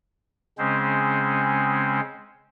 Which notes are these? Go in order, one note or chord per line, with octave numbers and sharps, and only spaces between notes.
C#3 G#3 C4 C#4 C5